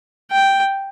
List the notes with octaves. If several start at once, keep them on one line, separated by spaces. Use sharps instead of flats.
G5